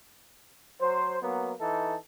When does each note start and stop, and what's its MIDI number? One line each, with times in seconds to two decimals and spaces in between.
0.81 1.19 54
0.81 1.19 72
1.23 1.54 54
1.23 1.54 58
1.23 1.54 59
1.61 1.95 52
1.61 1.95 63
1.61 1.95 69